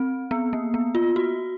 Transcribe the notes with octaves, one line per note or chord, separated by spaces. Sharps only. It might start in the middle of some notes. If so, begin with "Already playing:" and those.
Already playing: C4
B3
A#3
B3
F4
F#4